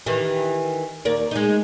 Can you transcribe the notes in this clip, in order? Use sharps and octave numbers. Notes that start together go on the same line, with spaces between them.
D#3 E3 G4
D#2 A#4 D5
G#3 D#4